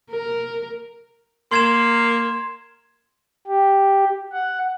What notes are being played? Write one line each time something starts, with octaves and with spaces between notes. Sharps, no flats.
A#4
A#3 C6 G#6 E7
G4
F#5